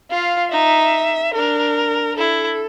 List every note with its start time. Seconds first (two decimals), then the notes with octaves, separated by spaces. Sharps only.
0.11 F4 F5
0.52 D#4 E5
1.35 D4 A#4
2.17 E4 A4